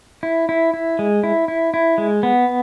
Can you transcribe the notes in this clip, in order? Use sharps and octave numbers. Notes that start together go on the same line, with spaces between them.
E4
E4
E4
G#3
E4
E4
E4
G#3
B3